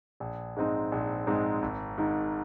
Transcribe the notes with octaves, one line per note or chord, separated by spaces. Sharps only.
A#1
G#2 G#3 C4 D#4
A#1
G#2 G#3 C4 D#4
G#1
G#2 D#3